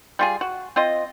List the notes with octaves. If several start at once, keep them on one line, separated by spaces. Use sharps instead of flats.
G3 F4 G#4
F#4
C4 F4 D#5